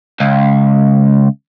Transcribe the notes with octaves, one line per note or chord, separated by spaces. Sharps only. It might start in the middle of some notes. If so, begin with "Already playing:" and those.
C#2